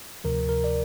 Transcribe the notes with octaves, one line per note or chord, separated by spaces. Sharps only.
D2 C3 F3 A#4
A#4
D5